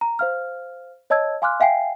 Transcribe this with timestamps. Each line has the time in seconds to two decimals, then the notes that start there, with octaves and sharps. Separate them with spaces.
0.01 A#5
0.19 C5 F5 F6
1.10 C#5 D#5 A5 E6 G#6
1.42 F5 G#5 C6 D6 F6 F#6
1.60 E5 F5 G5 G#5 C7